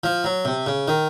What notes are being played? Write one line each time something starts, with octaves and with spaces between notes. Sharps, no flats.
F3
F#3
C3
C#3
D#3